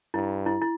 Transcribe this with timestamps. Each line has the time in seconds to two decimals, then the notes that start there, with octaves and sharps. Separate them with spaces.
0.14 G2 E4
0.46 E4
0.62 E4